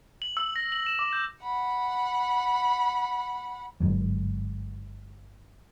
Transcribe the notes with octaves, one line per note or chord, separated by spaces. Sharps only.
F#7
E6
A#6
F#7
E7
D6
G6
F#5 B5
G1 G#2 F#3 G3